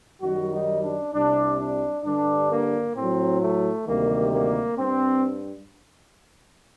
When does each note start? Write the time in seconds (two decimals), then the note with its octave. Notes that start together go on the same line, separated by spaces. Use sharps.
0.22 F#2 D#3 G3 F#4
0.52 D#4
0.83 D4
1.13 C2 C3 G3 D4
1.59 D4
2.04 G2 D3 G3 D4
2.50 A#3
2.95 A2 F#3 C4
3.42 A3
3.87 D2 C3 D#3 G3 A#3
4.33 A#3
4.78 G2 C4